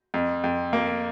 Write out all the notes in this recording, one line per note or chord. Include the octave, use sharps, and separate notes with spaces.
F2
F2
A#3